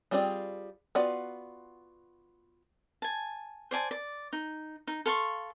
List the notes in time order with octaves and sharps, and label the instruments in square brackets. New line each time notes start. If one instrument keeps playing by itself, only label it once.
[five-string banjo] G3 C4 F4 G#4 D5
B3 F4 F#4 D5
[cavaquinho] G#5 A5
C5 D5 G#5 A5
D5
D#4
D#4
A4 F5 C6 C#6